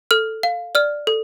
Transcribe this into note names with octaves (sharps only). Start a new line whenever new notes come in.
A4 F6
F5
D5 F6
A4